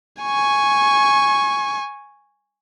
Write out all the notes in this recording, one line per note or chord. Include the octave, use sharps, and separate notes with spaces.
G#5 C#6